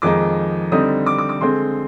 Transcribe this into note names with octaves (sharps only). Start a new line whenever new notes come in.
F2 D#3 G#3 D#4 D6
D3 G3 C4 D#4 D#6
D6
D6
D6
D3 G#3 C4 C6